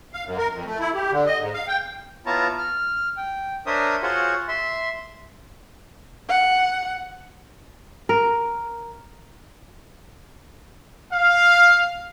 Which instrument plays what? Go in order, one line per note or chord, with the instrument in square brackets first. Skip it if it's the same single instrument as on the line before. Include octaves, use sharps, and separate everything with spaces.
[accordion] F5
F#2
A#4
F2
A3
E4
G4
D3
D#5
G#2
F5
G5
[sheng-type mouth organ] B3 E4 F4 C#5 A5 A#5
F6
G5
D4 A#4 C5 C#5 E5 D#6
F4 F#4 G#4 C5 C#5 F#5
E5 C6
[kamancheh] F#5
[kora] A#4
[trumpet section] F5